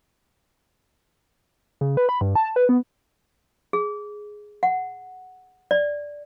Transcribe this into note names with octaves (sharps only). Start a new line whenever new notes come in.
C#3
B4
B5
G2
A5
B4
B3
G#4
F#5
D5